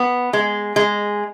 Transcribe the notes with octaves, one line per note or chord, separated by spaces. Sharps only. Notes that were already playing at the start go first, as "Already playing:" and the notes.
Already playing: B3
G#3
G#3